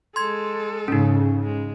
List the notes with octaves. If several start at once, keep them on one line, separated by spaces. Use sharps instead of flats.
G#3 A4 C6 G#6
G#2 C#3 C#4 D#4
G#3